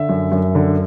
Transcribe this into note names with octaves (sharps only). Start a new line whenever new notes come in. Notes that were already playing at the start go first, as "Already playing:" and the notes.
Already playing: D3 E5
F#2
F#2
D3